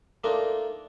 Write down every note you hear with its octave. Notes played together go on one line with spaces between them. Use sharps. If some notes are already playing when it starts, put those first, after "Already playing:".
A3 A#3 D4 D#4 F4 A#4